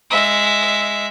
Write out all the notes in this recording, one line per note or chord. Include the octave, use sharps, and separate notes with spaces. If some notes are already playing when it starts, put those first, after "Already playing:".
G#3 E5